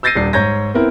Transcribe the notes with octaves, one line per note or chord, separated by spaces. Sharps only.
E6 G6 A6 A#6 C7 D#7
D#1 D4 C7
G#2 C#5 A#5 G6 G#6 A#6
B3 C4 E4 A#4